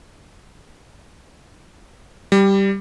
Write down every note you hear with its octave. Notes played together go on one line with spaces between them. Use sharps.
G3